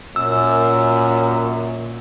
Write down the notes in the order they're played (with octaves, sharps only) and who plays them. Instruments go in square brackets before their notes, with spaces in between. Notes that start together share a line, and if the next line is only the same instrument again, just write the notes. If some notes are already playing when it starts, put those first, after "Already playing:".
[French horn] F#2 [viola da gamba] A#2 [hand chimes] E6